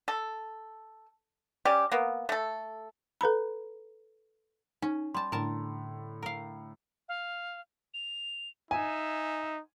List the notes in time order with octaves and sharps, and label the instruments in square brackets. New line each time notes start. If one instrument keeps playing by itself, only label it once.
[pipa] A4
G3 C#4 G4
A#3 B3
A3 A4
[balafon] A4 B4 A#5 B5
[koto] C#4 [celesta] D#4
[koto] G3 A5 [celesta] C6
[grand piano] A2 D3 [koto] A#4 A5
[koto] A#4 F5
[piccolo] F5
F7
[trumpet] D#4 [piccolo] E5 [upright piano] G#5